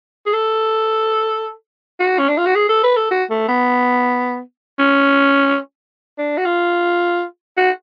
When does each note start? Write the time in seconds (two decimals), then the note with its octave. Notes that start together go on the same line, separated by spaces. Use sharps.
0.26 G#4
0.33 A4
1.99 F#4
2.19 C#4
2.29 D4
2.38 F4
2.46 F#4
2.55 G#4
2.69 A4
2.84 B4
2.97 A4
3.11 F#4
3.30 A3
3.49 B3
4.79 C#4
6.18 D4
6.38 F#4
6.46 F4
7.57 F#4